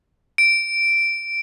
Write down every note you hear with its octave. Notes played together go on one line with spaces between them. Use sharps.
D7